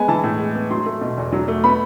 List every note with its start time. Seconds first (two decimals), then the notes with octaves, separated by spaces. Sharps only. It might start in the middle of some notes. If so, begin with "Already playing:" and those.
Already playing: G#3 B3 G#5
0.08 E3 A5
0.23 A2
0.39 G#3
0.55 B3
0.70 F#3 C6
0.86 A3
1.01 B2
1.17 E2
1.32 F#3
1.48 A3
1.64 B3 B5